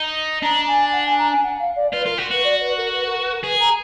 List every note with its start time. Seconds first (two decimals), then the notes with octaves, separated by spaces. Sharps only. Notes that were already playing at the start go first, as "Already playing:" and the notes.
Already playing: D#4
0.43 D4 A#5
0.67 G#5
0.92 F#5
1.05 G#5
1.18 A#5
1.31 G#5
1.44 F#5
1.60 F5
1.76 D5
1.93 F4 B4
2.05 F4 A#4
2.18 F#4
2.31 F#4 B4
2.44 D5
2.60 B4
2.77 A#4
2.93 B4
3.06 A#4
3.19 B4
3.31 A#4
3.43 G#4 B4
3.60 A#5